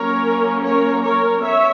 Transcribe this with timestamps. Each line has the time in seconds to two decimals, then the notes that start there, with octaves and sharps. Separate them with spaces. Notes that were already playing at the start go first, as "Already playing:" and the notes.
Already playing: F#3 A#3 C#4 A#4 C#5
0.63 A#4 C#5
1.02 A#4 C#5
1.42 B3 C#5 E5